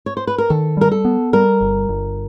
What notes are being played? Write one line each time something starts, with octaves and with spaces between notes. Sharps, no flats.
C#5
C5
B4
A#4
D#3 A4
G3 A#4
A4
B3
G3 A#4
G1
G1